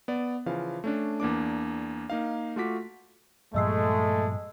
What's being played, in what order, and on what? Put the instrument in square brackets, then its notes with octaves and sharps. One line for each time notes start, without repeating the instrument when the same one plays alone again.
[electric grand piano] B3 D5
C#3 E3 F3 F5
A3 C#4 D4
E2 A#3 D4 D6
A#3 D#4 F5
A3 F4 F#4 D6 B6
[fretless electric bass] G2 A#2 F3 [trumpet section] G#3 A3 [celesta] D#5 E6 C7